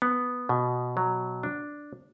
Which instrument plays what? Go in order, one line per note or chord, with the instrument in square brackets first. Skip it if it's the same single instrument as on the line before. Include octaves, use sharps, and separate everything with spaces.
[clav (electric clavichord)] B3
B2
F#3
D4